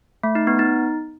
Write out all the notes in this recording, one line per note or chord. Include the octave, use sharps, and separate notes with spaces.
A3
D#4
B3
D#4